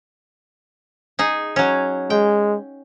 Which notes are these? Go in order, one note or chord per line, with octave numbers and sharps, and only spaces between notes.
D#4 G#4
F#3 C#4
G#3 G5